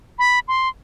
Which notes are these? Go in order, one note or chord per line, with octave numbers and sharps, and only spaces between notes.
B5
C6